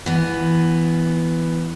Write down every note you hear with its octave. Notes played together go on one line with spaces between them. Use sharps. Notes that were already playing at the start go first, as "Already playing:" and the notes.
E3 B3